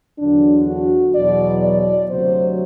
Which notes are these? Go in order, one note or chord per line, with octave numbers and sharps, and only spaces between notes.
E2 D3 F#3 D4
F#4
E2 B2 F#3 D5
D5
D2 C3 F#3 C5